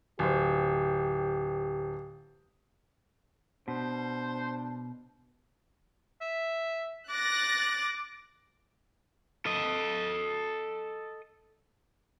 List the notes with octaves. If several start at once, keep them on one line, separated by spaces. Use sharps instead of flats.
D1 G4 C5
B2 D4 C5
E5
D6 F#6 A6 A#6
A4 D#5